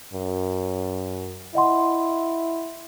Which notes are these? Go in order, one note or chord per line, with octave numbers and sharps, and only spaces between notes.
F#2
E4 D#5 F#5 C6